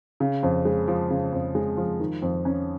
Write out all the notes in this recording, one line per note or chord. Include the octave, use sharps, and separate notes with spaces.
C#3
F2
G#3
F3
C#3
F2
G#3
F3
D#3
F2
C#4